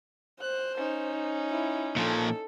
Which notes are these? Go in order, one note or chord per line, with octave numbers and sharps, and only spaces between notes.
C5 F#6
C#4 D#4
E4
A#2 F3 A4